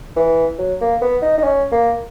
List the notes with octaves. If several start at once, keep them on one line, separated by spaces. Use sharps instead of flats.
E3
F#3
A#3
B3
D#4
D#4
C#4
A#3